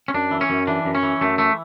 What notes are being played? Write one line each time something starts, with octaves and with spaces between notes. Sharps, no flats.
C#4
F#2 D4
E3
C#4
F#2
E3 D4
F#2
C#4
E3
F#2 A3
E3 A3